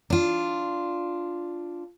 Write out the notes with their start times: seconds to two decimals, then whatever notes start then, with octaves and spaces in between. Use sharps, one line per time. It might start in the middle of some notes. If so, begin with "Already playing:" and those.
0.10 D4 F4